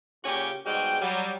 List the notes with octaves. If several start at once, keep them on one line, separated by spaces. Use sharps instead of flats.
A#2 C#3 C#4 F#4 G4
G#2 B2 G3 G#3 F#4 G5
F#3 G3